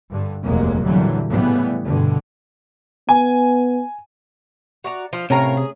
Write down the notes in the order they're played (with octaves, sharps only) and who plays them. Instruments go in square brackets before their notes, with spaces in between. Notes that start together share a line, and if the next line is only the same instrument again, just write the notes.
[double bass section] G2 D3
F1 D#2 A#2 F#3 G#3 A#3
A#2 D3 E3 F#3 G3
A2 C#3 E3 G3 B3
G2 B2 D3
[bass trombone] B3 [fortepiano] G#5
[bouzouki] F#4 D5 A#5
F3 F4
[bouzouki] A2 A#4 F5 [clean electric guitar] C3 [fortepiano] C#4 A#5
[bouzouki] G#4